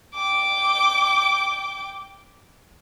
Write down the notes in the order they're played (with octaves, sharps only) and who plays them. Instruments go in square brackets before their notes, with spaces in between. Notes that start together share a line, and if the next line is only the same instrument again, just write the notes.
[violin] G5 D6